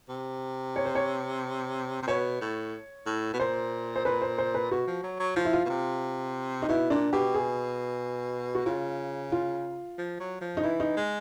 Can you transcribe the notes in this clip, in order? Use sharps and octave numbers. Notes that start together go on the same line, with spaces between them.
C3
C#5
C5
C#5
C3
B2 C#5
A2
A2
B2
A#2 C5
C5
A#2 B4
C5
C5
B4
B2 F#4
F3
F#3
F#3
F3 F4
E4
F4
B2
C3
D#4
B2 E4
A#2 D4
B2 G4
G#4
F#4
C#3 F4
F4
F3
F#3
F3
D#4
E3 E4
D#4
G#3